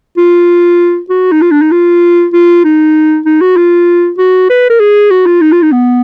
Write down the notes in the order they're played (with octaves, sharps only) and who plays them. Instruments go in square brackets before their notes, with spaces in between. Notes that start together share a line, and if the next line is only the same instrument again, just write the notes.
[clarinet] F4
F#4
D#4
F4
D4
D#4
F4
F4
D#4
D#4
F#4
F4
F#4
B4
A#4
G#4
F#4
F4
D#4
F4
D#4
B3